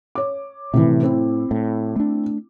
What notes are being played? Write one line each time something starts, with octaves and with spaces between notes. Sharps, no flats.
C#5 D6
A2 C3 E3
C4 E4
A2
A3 D4